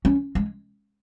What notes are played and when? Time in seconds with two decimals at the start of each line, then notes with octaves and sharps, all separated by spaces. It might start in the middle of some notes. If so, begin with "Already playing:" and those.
0.05 C#4
0.35 G#3